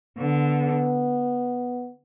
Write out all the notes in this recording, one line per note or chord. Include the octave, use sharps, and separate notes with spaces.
D3 B3